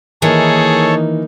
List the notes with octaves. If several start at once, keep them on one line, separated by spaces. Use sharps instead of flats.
D#3 E3 A#3 D#4 G#4 A4 C#5